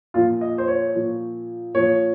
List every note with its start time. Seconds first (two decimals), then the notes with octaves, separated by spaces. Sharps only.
0.14 A#2 F3 F4
0.41 D#5
0.58 C5
0.68 C#5
0.95 A#2 F3
1.74 A#2 F3 C#5